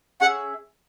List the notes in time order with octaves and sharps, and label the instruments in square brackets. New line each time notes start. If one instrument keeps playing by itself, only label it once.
[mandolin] C#4 G#4 E5 [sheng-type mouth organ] F#5